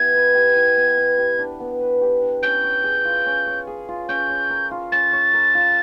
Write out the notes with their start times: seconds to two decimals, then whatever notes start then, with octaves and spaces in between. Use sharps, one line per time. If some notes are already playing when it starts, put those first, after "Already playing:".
Already playing: B3 E4 G4 G#6
0.14 B4
0.35 G4
0.56 E4
0.77 B3
0.97 B4
1.18 G4
1.39 D4
1.60 B3
1.80 B4
2.01 G4
2.22 D4
2.43 C#4 G6
2.63 C#5
2.84 G#4
3.05 F4
3.26 C#4
3.46 C#5
3.67 G#4
3.89 F4
4.09 C#4 G6
4.30 C#5
4.50 A#4
4.71 F4
4.92 C#4 A6
5.13 C#5
5.34 A#4
5.55 F4